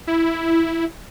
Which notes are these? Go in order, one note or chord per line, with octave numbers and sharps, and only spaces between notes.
E4